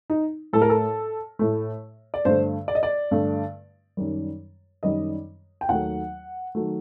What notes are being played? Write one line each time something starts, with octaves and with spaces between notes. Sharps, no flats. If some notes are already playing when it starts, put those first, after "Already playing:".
D#4
A2 A3 A4
A#4
A4
A2 A3
D5
G2 D3 A3 C5
D5
D#5
D5
G2 D3 A3
F#2 D#3 G3
F#2 D#3 G3 D#5
G5
D#2 D#3 F#3 A3 F#5
D#3 F#3 A3